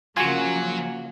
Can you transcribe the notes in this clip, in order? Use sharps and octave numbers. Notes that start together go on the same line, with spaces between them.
C#3 F3 F#3 A#3 F4 F#4 G#5